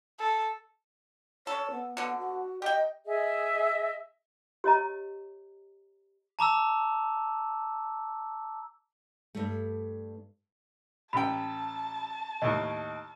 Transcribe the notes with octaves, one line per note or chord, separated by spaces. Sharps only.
A4
A4 C#5
B3
B2 D3 B3
F#4
G4 D#5 G5
G#4 D#5 E5
G4 C#5 D#5 A#5
A5 A#5 D6 E6
G2 A3
A1 G5 A5 B5
D#2 A2 D#5